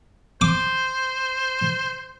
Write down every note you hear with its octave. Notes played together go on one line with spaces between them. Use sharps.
C5 D6